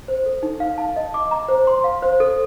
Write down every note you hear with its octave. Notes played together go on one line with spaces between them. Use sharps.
C5
A4
D#4
F5
A5
D#5
D6
A#5
C5
C6
F5
C5
A4